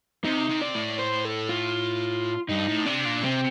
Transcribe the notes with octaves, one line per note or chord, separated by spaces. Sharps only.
C3 D#4
C3
D5
A2
C5
A4
F4
G2 D#4
A2
C3 D4
A#2
C3 C4